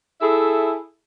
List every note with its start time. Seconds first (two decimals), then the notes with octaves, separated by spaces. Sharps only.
0.21 E4 G#4 A4 E5